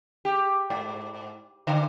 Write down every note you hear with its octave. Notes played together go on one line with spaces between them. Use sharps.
G4
G#2
D3